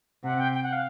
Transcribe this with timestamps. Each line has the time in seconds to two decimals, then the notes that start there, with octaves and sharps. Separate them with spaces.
0.24 C3 F#5
0.38 G5
0.54 G5
0.63 F#5
0.72 F5